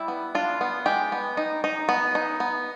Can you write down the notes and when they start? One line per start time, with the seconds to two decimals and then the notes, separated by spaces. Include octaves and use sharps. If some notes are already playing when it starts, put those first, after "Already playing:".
Already playing: G3 E4
0.08 B3
0.35 D4 F4
0.61 B3
0.86 G#3 G4
1.12 B3
1.37 D#4
1.64 D#4
1.89 B3
2.15 D#4
2.40 B3